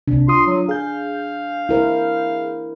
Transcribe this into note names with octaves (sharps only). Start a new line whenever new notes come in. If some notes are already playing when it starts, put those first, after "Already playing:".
C2 C3 D4
F4 C6 D#6
F#3
G#4 F5 G6
E4 A#4 C5